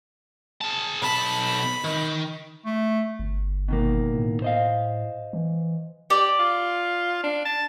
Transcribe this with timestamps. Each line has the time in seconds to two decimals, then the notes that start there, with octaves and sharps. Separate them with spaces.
0.61 G#4 A5
1.02 B1 A5 B5
1.84 D#3
2.65 A3
3.19 G1
3.68 B2 D#3 A#3
4.14 A2
4.42 C5 D#5 F5
5.33 E3
6.10 G4 D5
6.39 F4
7.24 D4
7.45 A5